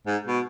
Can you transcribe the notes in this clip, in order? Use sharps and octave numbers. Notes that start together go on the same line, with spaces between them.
G#2
B2